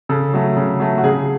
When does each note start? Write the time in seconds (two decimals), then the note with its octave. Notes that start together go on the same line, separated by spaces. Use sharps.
0.09 C#3 A4
0.34 F#3 A3
0.56 C#3
0.80 F#3 A3
0.98 F#4
1.04 C#3 G#4